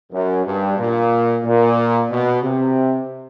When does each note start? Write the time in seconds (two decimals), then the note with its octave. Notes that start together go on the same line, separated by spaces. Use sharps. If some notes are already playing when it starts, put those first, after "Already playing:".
0.12 F#2
0.45 G2
0.78 A#2
1.44 A#2
2.10 B2
2.42 C3